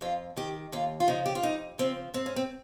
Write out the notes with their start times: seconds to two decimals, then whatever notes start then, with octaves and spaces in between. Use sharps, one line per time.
0.01 F2 F4
0.37 D#3 G4
0.72 D#2 F4
1.00 F4
1.08 C#3 F3 D#4
1.26 G4
1.35 F4
1.43 F2 D#4
1.78 C#3 F3 C4
2.14 G#2 C4
2.26 C#4
2.36 C4